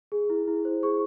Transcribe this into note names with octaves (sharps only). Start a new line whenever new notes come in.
G#4
E4
E4
C5
G#4 C#6